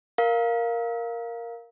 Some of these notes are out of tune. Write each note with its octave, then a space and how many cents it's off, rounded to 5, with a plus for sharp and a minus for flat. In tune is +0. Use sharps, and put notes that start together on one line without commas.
A#4 +0 F5 +0